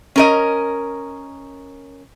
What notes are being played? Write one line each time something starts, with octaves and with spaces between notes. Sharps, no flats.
C#4 A#4 D#5